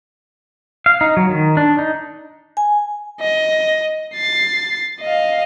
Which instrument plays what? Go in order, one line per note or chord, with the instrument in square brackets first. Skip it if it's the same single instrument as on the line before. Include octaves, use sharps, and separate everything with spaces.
[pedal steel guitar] F5
D#4
F#3
D#3
D4
D#4
[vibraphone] G#5
[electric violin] D#5
A6 C7
D#5 F5